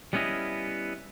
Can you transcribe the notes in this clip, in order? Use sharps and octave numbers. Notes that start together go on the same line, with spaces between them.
G3 B3 C#4 E4 D#5